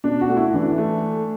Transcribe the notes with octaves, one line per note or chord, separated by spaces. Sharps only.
B2 D4
F#4
A3
E4
E3 D4
A3